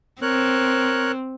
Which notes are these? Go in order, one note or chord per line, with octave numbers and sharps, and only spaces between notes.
C4 A#4 C#5 F#6